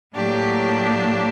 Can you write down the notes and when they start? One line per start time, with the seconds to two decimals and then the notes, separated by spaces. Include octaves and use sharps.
0.14 A2 F#3 A#3 D4 G4